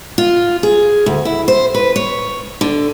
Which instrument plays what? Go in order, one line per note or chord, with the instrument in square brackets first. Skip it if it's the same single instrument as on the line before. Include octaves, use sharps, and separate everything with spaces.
[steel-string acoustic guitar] F4
G#4
D2
E4
C5
B4
C#5
D3